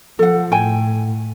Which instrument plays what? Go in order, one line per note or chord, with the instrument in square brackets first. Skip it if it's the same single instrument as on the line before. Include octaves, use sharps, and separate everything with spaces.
[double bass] F3 [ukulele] A4 F#5
[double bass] A2 [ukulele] G5 G#5